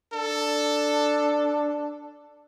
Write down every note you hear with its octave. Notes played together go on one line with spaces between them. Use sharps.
D4 A4